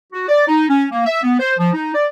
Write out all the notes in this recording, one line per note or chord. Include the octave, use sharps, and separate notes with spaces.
F#4
D5
D#4
C#4
A#3
E5
B3
C5
F3
D#4
D5